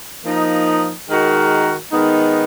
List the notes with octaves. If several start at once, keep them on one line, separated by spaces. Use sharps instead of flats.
F3 A#3 D#4
D#3 G#3 D#4 F#4 A#4
D#3 G#3 B3 D#4